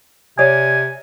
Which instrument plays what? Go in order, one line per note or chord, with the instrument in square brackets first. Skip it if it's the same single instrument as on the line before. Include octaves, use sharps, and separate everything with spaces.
[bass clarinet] C3 [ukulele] C#5 D5 [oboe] G#5